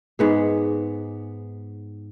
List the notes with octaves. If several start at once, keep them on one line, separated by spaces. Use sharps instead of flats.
G#2 B3 G#4